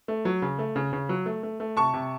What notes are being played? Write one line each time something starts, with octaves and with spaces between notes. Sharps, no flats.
A3
F#3
C#3
A3
C#3
C#3
F#3
A3
A3
A3
C3 A5 C#6
C3